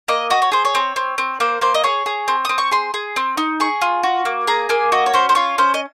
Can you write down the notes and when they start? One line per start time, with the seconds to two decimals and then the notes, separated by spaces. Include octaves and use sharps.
0.08 A#3 D#5
0.30 F#4 D#5
0.42 C#5
0.52 G#4 C5
0.65 C#5
0.75 C4
0.96 C4
1.18 C4
1.40 A#3 C5
1.61 A#3 C5
1.74 D#5
1.84 G#4 C#5
2.06 G#4
2.28 C4
2.45 C4 D#6
2.58 C#6
2.71 G#4 C6
2.94 G#4
3.16 C4
3.37 D#4
3.60 G#4 C#6
3.81 F4
4.03 F#4
4.25 A#3
4.47 G#4 A#5
4.69 A#3 G#5
4.92 F#4 D#5
5.06 C#5
5.14 C#4 C5
5.29 C5
5.35 F4 C#5
5.58 C#4 C5
5.74 D#5